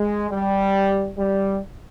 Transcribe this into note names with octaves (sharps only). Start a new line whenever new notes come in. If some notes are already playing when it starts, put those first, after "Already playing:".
Already playing: G#3
G3
G3